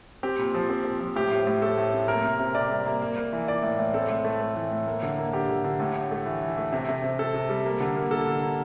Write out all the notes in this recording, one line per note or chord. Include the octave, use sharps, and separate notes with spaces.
C4 G4
A#2
F3
C4
C4
F3
A2 G4
A2
A2
A2 A4
A2
C4
A#3 A#4
C3
C3
C3 D5
G3
A#3
A#3
A#3
E3
E3 D5
A2
A2
C4 A4
A2
A3
A3
E3
A2
A#3
D3
A#3
D3 G4
D3
D3
A2
A2
A3
E3
E3
A3
C3
C3
C3
C3 A4
C3
G3
A#3
D3
A#3
A#3 A4
D3
A#3